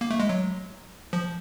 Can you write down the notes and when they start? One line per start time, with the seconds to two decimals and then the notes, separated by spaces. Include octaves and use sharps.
0.01 A#3
0.11 A3
0.20 G#3
0.29 F#3
1.13 F3